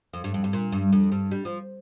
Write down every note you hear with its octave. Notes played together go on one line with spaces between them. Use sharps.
F2
G2
F2
G2
A#2
G2
F2
G2
G3
F3